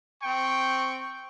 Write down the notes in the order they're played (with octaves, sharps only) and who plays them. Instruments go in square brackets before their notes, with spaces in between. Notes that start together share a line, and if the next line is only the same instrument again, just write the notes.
[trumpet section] C4 G5 C#6